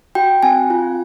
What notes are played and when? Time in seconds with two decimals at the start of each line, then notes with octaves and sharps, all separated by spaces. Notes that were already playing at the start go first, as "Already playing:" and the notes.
0.15 F#4 G5
0.43 C4 G#5
0.70 F4